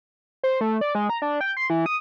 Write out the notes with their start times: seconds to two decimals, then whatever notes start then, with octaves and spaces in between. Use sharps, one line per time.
0.43 C5
0.61 A3
0.81 D5
0.95 G#3
1.10 A#5
1.22 D4
1.41 G5
1.57 C6
1.70 E3
1.86 D#6